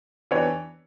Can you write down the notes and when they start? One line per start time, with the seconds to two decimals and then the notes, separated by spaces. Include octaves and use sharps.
0.31 E3 B3 D4 G4 C#5